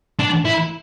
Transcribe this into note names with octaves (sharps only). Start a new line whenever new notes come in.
D4
E4